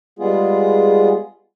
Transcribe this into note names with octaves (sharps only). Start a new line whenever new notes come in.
G3 G#3 B3 F4 G#4